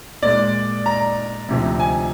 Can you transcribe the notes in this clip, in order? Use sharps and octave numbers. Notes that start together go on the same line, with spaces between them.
A#2 G#3 D5
A#5
D2 C3 F3
G#5